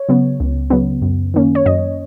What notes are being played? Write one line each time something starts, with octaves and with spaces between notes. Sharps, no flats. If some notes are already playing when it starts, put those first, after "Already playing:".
Already playing: C#5
C#3 F#3 B3
C#2
C#3 F#3 B3
F#2
D#3 A#3 C#4
C#5
F#2 D#5